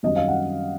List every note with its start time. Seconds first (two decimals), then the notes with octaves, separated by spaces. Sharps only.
0.03 F#2 D#3 G3 C4 D#5
0.16 F5
0.28 F#5